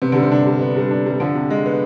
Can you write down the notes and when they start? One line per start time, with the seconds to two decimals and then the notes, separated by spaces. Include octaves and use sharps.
0.02 C3 B3
0.12 D3 G3
0.23 C3
0.31 D4
0.47 G3
0.61 B3
0.76 G3
0.91 D4
1.06 C3 G3
1.20 D3 F3
1.35 C3
1.50 G#3
1.66 B3